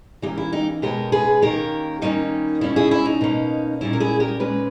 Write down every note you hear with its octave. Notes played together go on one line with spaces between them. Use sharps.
E3 A#3 C#4 D#4 G4
E4
D#4 G4
B2 G#3 C#4 G4 A#4
G#4 B4
D#3 A#3 C#4 G4 A#4
D#3 G3 A#3 C#4 D#4
B2 G3 C#4 E4
E4 G#4
E4
D#4
B2 A#3 C#4
A#2 G3 C#4 E4
A#4
E4 G#4
G4 A#4
A#2 G#3 C#4 G#4 B4